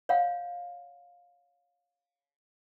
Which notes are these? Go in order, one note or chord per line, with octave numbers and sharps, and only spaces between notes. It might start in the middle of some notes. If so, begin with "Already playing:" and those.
C#5 F5 F#5